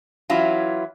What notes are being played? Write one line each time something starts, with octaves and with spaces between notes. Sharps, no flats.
E3 F#3 C#4 E4 F4